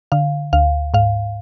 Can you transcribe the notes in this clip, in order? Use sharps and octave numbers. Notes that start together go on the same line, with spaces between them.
D3 F5
D2 F5
G#2 F5